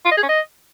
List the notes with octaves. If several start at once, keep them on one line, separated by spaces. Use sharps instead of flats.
F4
D#5
G#4
C#4
D#5